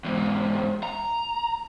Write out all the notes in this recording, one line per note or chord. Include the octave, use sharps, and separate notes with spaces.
E2 G#2
A#5